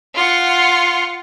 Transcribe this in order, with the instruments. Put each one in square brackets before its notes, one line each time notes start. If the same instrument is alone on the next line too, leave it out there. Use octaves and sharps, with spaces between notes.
[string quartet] F4 F#5